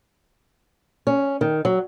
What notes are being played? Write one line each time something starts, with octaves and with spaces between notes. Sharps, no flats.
C#4
D#3
F#3